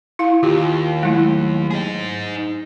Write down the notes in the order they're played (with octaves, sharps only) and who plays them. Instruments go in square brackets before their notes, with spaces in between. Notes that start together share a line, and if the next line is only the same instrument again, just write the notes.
[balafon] E4 F5
[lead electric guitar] D#2 [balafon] F4 G4
[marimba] F#3 A3 [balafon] G#3 E4
[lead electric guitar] D#4 G#4